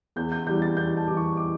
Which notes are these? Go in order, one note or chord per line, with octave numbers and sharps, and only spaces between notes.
E2 G6
G6
E3 G3 G6
A6
E2 G6
A5
E3 G3 D6
C#6
D6